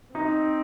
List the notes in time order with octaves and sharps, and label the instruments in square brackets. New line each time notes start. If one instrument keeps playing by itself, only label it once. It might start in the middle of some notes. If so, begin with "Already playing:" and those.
[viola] C4 [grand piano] D#4